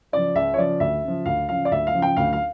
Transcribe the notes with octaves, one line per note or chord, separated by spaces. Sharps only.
C#3 F3 D5
C#2 E5
C#5
C#3 F3 D5
D2 E5
C#3 F3
D2 F5
C#3 F3 F5
D5
D2 E5
F5
C#3 F3
G5
D2 F5
F5